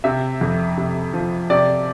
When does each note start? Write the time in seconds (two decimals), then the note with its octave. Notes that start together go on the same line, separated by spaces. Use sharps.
0.04 C3 E5
0.41 F2
0.77 C3
1.13 F3
1.50 C3 D5